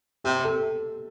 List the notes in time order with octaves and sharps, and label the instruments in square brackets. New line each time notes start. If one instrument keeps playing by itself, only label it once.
[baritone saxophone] C3 [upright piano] G4
[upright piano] A4